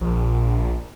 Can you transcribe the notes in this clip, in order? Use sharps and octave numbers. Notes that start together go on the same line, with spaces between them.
A#1